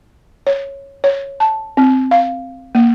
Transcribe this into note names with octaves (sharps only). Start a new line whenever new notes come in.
C#5
C#5
A5
C4
F5
A#3